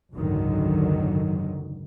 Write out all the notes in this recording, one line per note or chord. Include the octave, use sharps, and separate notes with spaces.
F#1 C#2 G#2 D3 D#3 F#3